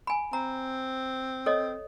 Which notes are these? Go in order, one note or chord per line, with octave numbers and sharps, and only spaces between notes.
G#5 B5
C4 A#5
A4 C#5 D#5